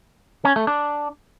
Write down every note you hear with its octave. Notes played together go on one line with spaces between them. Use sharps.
C#4
A3
D4